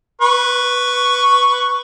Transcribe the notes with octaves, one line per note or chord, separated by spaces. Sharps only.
B4 C#6